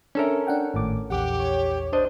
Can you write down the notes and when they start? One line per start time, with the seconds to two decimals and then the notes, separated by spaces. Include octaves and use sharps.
0.15 C#4 D4 A4 A#4 E5
0.47 D4 F#5 G5
0.74 G#1 A2 D6
1.10 A#1 E2 G4 F#5 D6
1.39 C#5
1.93 D4 C5 D#5